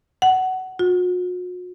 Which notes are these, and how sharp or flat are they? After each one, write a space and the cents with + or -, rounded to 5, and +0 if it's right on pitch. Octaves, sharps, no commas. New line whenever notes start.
F#5 +20
F#4 -45